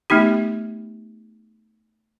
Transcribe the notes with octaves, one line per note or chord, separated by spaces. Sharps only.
A3 B3 D#4 G4